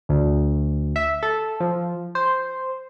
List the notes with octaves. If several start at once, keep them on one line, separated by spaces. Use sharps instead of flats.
D2
E5
A4
F3
C5